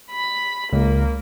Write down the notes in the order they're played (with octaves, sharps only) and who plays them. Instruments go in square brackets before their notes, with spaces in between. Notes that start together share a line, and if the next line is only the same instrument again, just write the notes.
[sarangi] B5
[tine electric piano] C#2 [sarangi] A#3